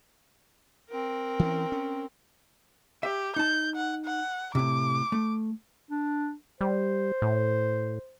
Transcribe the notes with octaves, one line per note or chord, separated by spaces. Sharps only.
C4 A#4
E3 C#4
C#4
G4 E5
D#4 A5 G6
F#5
F#5
A2 C3 D6
A3
D4
G3 C5
A2